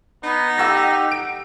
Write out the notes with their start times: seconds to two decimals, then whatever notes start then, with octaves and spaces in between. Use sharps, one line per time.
0.23 B3 D#4
0.58 G4 F#5 E6 A#6
1.12 D7